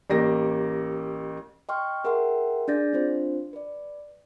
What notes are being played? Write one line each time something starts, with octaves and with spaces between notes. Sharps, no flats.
A1 A#3 G4 A#6
D#5 G5 C6 C#6 F6
G#4 A#4 E5 F#5 G5 C6
D4 G#4 D5 G6 A6 A#6
C4 D4 F4 C5
B4 D5